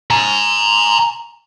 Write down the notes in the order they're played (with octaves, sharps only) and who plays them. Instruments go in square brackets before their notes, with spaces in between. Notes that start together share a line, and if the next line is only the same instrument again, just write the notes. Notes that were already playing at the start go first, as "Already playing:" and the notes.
[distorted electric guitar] G#5 A#5